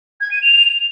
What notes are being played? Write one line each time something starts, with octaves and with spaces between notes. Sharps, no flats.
G#6
D#7
F7